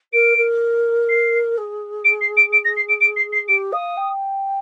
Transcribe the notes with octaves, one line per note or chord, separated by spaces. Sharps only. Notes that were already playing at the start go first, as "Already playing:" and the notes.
A#4 D7
A#4
C7
G#4
D7
C7
D7
D7
A#6
C7
D7
D7
C7
C7
G4 D7
F5 D#6
G5